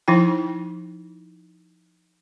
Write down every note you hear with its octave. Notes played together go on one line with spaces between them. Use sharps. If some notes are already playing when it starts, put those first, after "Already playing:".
F3 D#4 E4 G5